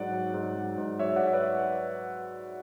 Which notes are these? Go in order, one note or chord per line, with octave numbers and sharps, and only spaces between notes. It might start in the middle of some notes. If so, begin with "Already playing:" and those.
Already playing: G#2 F#3 D5 F#5
F#3
G#2
F#3
G#2
F#3 C#5 E5
D5 F#5
G#2
E5
B4 D5